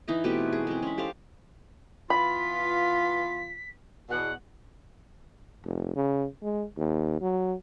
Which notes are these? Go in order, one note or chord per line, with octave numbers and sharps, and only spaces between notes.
E3 D#4 E4 D#5
B2 A3 C4 G4
G#4
G#3 C4
C#4 B5
G4 A4 C5 F5
E3 B3 F4 B5 B6
E2 B2 F#5
F1
C#3
G#3
D#2
F#3